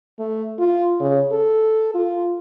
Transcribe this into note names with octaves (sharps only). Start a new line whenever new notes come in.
A3
F4
C#3
A4
F4